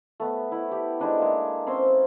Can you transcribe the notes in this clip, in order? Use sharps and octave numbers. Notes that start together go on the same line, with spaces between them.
A3 B3
E4
G4
G3 G#3 D4 D#4
G#3 A#3 E5
C4 C#4 C6 E6